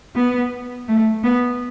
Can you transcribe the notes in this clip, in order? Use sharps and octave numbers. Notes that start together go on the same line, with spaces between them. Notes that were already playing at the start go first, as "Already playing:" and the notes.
B3
A3
B3